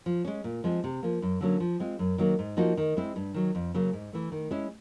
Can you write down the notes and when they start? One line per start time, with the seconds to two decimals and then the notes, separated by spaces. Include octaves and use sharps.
0.06 F3
0.25 G#3 C#4
0.44 A#2
0.64 F3 G#3 C4
0.84 C3
1.03 F3 A#3
1.22 F#2
1.41 D3 F#3 A#3 C#4
1.60 F3
1.80 G#3 C4 F4
1.99 F#2
2.18 D#3 F#3 A#3
2.39 G#2
2.57 F3 A#3 D#4 F#4
2.77 D#3
2.97 G#3 C4 E4
3.16 G2
3.34 D#3 F#3
3.55 F2
3.74 C#3 F#3 A#3
3.93 G#2
4.13 E3 A3
4.32 D#3
4.51 G#3 C#4 E4